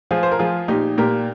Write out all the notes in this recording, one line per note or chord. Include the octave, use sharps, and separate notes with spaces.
F3 F4 G#4
C5
A#4
F3 F4 G#4
A#2 D#4 G4
A#2 G4 A#4